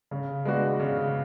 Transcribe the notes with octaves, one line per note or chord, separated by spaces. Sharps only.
C#3
G#3 B3 D4 F#4
C#3